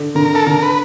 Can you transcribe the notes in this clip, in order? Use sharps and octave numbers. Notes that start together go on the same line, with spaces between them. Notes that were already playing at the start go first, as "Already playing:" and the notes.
Already playing: D3
D3 A#4
A4
D3 A#4
B4